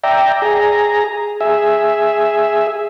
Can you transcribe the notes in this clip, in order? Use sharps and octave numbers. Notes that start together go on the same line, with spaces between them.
D5 E5 G5 A#5
G#4 A#5
G#4 E5